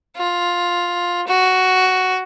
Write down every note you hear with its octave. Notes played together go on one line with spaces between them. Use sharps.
F4
F#4